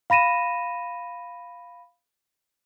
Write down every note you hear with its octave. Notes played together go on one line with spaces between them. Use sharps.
F5 B5 A#6 D#7 E7